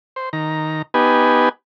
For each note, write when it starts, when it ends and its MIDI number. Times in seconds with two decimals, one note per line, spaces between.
0.16 0.29 72
0.33 0.82 51
0.33 0.82 82
0.94 1.49 59
0.94 1.49 63
0.94 1.49 67
0.94 1.49 71
0.94 1.49 80